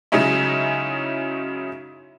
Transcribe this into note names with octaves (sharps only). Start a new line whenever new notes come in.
C#3 F#3 G#3 C#4 D#4 E4